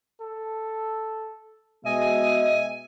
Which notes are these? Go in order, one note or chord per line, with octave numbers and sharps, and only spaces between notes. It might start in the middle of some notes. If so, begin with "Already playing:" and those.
A4
B2 G#3 D#5 E5 G#5